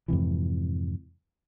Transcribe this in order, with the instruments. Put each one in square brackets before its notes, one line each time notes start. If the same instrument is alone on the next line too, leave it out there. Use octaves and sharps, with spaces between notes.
[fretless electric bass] F2 G#2 C3 E3